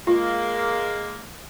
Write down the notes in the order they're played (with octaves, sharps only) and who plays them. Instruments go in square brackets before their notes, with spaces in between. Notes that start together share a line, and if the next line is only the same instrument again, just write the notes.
[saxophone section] G#3 A#3 [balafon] F4